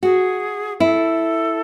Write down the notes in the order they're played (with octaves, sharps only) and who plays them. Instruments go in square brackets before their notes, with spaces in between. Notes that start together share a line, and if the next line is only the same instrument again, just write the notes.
[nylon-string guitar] F#4 [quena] G#4
[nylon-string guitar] E4 [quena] A4